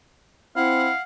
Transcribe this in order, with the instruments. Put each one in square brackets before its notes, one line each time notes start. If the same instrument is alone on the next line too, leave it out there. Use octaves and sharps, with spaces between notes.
[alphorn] C4 [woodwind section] E4 [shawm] F5 [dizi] F#5